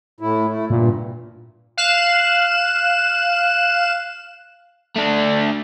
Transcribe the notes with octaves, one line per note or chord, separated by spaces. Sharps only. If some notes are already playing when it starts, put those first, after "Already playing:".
A2 E4
A3 E4
G2 A#2
F5 F#6 E7
A3 D4